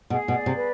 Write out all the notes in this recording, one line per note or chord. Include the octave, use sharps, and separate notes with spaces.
B2 G#4
B2
D5
C3
B4